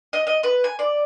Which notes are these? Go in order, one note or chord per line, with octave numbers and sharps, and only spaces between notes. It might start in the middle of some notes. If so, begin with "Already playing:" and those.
D#5
D#5
B4
G#5
D5